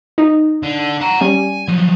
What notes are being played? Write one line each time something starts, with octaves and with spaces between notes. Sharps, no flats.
D#4
D3
F#5 A#5
G3 C#4 G#5
F3 F#3